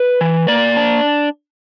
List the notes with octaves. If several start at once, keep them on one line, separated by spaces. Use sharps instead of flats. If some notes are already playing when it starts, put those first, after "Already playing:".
Already playing: B4
E3
A#3 D5
D4